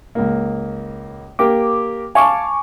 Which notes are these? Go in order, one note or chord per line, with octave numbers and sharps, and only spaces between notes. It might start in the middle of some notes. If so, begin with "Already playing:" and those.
C#2 A#3
A#3 G4 A#4 D6
F5 G#5 A5 C#6 D6